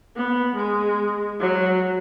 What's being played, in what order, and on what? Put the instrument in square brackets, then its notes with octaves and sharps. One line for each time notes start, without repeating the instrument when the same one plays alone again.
[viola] B3
G#3
F#3